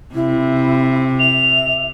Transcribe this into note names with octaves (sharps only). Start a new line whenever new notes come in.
C3 E4
E5 F7